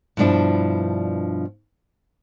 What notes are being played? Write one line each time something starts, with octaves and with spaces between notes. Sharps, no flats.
G2 B2 F3 D4 E4